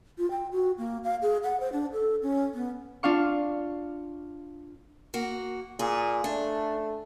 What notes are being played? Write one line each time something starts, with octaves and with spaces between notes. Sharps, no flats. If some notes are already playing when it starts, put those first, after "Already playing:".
F4
G5
F#4
A#3
F5
G#4
F#5
C5
D4
A4
C#4
B3
D4 F4 F5 C#6
A#3 F#4
A#2 G#4
A3 D4